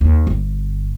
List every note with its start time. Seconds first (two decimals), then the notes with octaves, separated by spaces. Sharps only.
0.01 D#2
0.27 G1